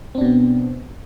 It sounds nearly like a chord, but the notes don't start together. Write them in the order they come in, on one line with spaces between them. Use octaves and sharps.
C4 D4 B2 B3